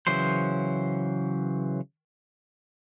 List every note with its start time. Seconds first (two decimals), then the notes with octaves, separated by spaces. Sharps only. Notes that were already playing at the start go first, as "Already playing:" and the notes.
0.07 C#3 E3 F#3 C5